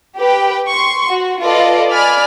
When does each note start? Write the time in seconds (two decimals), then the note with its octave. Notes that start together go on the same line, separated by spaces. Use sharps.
0.16 G4 B4 G5
0.69 C6 C#6
1.08 F#4
1.42 F4 A4 B4 D5 D#5
1.91 D5 G#5 B5 F6